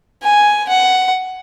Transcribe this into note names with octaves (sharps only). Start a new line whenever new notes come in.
G#5
F#5